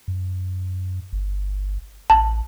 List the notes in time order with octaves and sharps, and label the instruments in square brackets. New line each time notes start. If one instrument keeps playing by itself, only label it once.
[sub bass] F#2
G1
[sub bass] A1 [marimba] A5